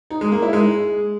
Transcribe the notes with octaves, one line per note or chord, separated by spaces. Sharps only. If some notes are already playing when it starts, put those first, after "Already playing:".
D#4
G#3
A#3
E4
G#3